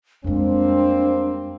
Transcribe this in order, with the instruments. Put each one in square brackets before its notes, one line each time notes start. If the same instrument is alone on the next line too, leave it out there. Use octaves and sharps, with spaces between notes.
[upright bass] F2 G#3 [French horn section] G3 A#3 C4 [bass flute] D4